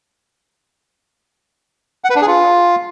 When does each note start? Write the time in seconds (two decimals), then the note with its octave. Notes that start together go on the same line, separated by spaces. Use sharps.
2.04 F#5
2.10 B4
2.16 D4
2.21 G#4
2.27 F4